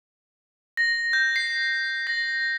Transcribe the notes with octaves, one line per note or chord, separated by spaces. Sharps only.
A#6
G6
C7
A#6